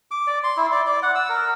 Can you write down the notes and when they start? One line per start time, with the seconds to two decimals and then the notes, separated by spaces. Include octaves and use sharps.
0.11 D6
0.27 D5
0.44 C6
0.57 E4
0.72 D5
0.87 D5
1.03 F#5
1.15 E6
1.29 A#4